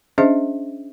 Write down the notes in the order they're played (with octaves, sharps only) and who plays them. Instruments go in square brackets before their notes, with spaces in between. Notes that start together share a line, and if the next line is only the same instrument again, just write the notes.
[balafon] C#4 D4 G#4 C5 D#5 E5